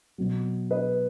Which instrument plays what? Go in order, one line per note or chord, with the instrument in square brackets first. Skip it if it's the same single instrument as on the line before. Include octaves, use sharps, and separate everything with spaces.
[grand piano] B2 F#3
B4 D#5